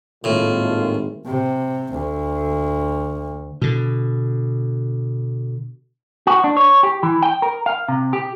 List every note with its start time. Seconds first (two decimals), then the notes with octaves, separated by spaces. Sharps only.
0.24 G#1 D#2 A2 D#3 A3 F4
1.26 C3
1.93 D2
3.62 B2 D3
6.27 F#4
6.44 D4
6.57 C#5
6.83 G4
7.03 E3
7.23 G5
7.42 A#4
7.66 F5
7.88 C3
8.13 G4